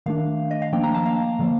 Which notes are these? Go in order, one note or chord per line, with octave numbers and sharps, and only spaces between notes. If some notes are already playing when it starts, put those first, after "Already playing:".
D#3 A3 D4 F5
D#5
F5
F3 A#3 D4 G5
A#5
A5
F5
D3 F3 A#3